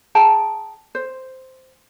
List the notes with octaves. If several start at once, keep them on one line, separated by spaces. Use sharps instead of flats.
G#4 G5 A5 A#5
C5